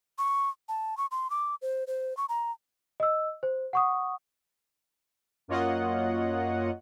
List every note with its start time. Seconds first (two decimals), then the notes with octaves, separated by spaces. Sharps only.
0.18 C#6
0.69 A5
0.97 C#6
1.11 C6
1.30 D6
1.62 C5
1.87 C5
2.17 C#6
2.29 A#5
3.00 D#5 E6
3.43 C5
3.73 F#5 C#6 D#6
5.48 F#2 A#3 F4 C#5 D#5 F#5